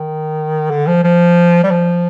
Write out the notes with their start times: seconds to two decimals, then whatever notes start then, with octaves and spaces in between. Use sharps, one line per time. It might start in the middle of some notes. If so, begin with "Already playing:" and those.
Already playing: D#3
0.70 D3
0.87 F3
1.04 F3
1.63 G3
1.70 F3